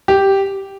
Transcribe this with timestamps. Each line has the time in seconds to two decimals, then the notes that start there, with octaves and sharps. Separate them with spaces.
0.08 G4